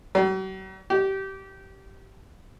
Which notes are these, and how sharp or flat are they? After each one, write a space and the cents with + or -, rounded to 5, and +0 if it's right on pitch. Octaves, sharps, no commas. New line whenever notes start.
F#3 +45
G4 -20